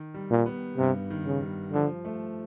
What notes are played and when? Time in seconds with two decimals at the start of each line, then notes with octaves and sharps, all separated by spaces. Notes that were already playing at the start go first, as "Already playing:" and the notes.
Already playing: D#3
0.14 G3
0.30 A#2
0.46 B3
0.78 G2 C3
1.10 D#3
1.26 C#3
1.41 G3
1.73 D3 F3
2.05 A3